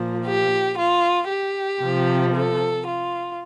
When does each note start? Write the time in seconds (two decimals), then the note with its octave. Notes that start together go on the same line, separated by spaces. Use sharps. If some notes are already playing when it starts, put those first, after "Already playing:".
Already playing: A#2 F3
0.25 G4
0.76 F4
1.28 G4
1.81 C3 F3
2.33 A4
2.86 F4